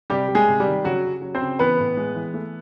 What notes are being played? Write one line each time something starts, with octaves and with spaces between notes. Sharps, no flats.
C3 G3 G4
G3
G#3 G#4
C3
G3 G4
D#3
C#3 F#3 F#4
C#3
F#3
C4 C5
C#3
E3 B3 B4
A2
G#3
E3
A3